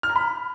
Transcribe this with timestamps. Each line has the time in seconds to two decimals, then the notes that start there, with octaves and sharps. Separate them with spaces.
0.03 F6
0.09 A#5
0.16 B5